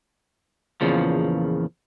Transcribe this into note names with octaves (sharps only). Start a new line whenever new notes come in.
E2 A#2 C#3 F3